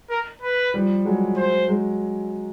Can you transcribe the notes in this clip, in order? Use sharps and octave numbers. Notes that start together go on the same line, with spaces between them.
A#4
B4
F3 G3
F#3 G#3
C5
F#3 G#3